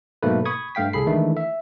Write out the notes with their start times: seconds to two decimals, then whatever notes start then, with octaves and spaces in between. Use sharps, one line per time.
0.23 G#2 B2 F#3 A3 A#3 B4
0.45 B5 C#6 D#6 G#6
0.75 G2 A3 F5 G5 B6
0.93 C2 G#4 A4 B5 C7
1.07 D#3 E3 G#3 A3 D4 E4
1.37 E5